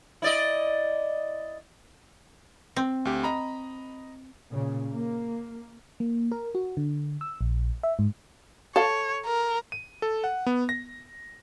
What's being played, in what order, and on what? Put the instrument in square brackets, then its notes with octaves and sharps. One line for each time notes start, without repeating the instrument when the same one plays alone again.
[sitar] E4 D5 D#5
[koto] C4
[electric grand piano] D2 G4
D#5 A#5 B5
[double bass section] A#2 C#3
A#3
[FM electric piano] A#3
A#4
F#4
D3
E6
A#1
E5
G#2
[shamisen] A4 F5 [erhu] C#5
[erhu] A#4
[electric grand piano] D#7
A4
F#5
B3
A#6